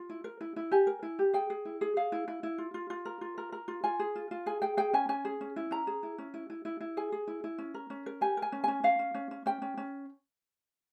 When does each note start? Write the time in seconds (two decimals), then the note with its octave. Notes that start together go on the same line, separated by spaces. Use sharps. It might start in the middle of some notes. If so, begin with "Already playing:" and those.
Already playing: F4
0.10 E4
0.24 A#4
0.41 E4
0.56 E4
0.71 G4 G#5
0.87 A#4
1.03 E4
1.19 G4
1.34 G#4 G5
1.50 G#4
1.65 E4
1.81 G#4
1.97 G#4 F5
2.12 E4
2.28 E4
2.43 E4
2.58 F4
2.74 F4
2.90 F4
3.05 A#4
3.21 F4
3.38 A#4
3.52 A#4
3.68 F4
3.84 F4 G#5
3.99 G#4
4.15 F4
4.31 F4
4.46 G#4 G#5
4.62 G#4 G5
4.77 G#4 G5
4.93 C#4 G#5
5.09 C#4 G#5
5.25 G#4
5.41 C#4
5.56 E4
5.71 C#4 A#5
5.87 G#4
6.03 E4
6.18 C#4
6.34 E4
6.50 E4
6.65 E4
6.81 E4
6.97 G#4 G#5
7.12 G#4
7.27 E4
7.44 E4
7.58 C#4
7.74 A#4
7.90 C#4
8.06 A#4
8.21 G4 G#5
8.37 A#4
8.42 G#5
8.52 C#4
8.64 C#4 G#5
8.84 C#4 F5
8.99 C#4
9.14 C#4
9.31 C#4
9.46 C#4 G5
9.62 C#4
9.77 C#4